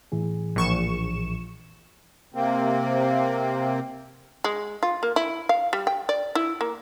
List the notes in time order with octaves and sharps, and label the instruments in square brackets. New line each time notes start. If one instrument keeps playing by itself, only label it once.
[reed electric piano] A2 E3 G#4
[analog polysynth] A#1 C#6 E7
[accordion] C3 A#3 C4
[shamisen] G#3
F4
A#3
E4
F5
G3
G5
D5
E4
A#3